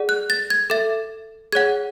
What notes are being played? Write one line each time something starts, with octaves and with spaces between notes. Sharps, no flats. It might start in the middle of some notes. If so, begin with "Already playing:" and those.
Already playing: G#4 D5 F#5
F#6
A6
G#6
A4 E5 A6
G#4 C#5 F#5 G#6